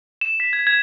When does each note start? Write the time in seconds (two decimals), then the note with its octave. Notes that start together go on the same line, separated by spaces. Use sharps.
0.21 E7
0.40 B6
0.53 G#6
0.67 G#6